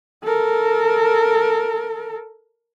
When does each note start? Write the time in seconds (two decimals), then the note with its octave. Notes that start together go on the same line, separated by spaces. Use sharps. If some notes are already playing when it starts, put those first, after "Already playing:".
0.24 A4 A#4